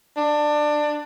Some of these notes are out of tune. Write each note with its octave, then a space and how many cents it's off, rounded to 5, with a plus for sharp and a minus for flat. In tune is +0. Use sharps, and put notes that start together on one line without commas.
D4 +20